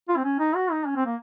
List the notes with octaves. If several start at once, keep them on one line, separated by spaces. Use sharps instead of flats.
F4
C4
C#4
D#4
F#4
D#4
C#4
C4
A#3